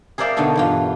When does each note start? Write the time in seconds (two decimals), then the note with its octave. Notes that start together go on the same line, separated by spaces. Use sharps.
0.18 G#4 A#4 C5 D5 E5 F5
0.36 B2 D3 B3 D#4 A4 A#4
0.56 E2 G2 F4